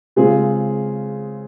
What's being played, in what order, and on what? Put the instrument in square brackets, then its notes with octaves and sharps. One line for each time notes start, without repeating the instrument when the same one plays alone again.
[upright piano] C#3 G#3 C4 F4 G#4